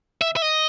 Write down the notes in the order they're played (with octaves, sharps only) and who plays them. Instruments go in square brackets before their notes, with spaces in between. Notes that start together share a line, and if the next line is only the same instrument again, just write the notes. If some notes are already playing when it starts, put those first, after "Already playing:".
[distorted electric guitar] E5
E5
D#5